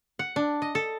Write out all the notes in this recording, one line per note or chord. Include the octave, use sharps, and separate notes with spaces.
F#5
D4
D#5
A4